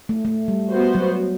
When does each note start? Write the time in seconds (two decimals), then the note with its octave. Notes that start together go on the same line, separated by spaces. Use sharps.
0.09 A3
0.25 A3
0.48 G3
0.72 B3 F#4 C5
0.95 F#3